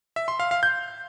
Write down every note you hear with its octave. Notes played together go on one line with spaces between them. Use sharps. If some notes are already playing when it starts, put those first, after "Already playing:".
E5
C6
F5
F5
G6